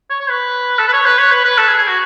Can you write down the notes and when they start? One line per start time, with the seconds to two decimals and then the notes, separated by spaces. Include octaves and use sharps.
0.10 C#5
0.20 C#5
0.30 B4
0.79 A4
0.88 B4
0.93 C#5
1.06 B4
1.18 C#5
1.31 B4
1.45 B4
1.58 A4
1.68 G#4
1.78 G#4
1.88 F#4